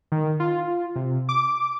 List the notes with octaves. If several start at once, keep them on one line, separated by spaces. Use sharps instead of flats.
D#3
F4
C3
D6